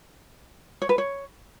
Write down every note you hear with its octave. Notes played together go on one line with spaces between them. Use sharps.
C#5
B4
C#5